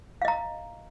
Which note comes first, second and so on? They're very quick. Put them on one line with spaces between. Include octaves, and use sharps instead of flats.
F5 D#5 A#5